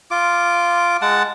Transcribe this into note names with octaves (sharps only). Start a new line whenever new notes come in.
F4 D6
G#3 F#5 A5